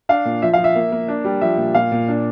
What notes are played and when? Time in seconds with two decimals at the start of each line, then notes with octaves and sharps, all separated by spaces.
0.09 D4 F5
0.25 A#2
0.42 F3 E5
0.53 F5
0.58 F3
0.64 E5
0.76 A#3
0.92 A#3
1.08 D4
1.25 G3
1.41 F3 E5
1.57 A#2
1.74 A#2 F5
1.92 A#2
2.08 D4